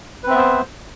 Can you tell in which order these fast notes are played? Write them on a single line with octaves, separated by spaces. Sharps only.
B4 C4 E5 B3 C5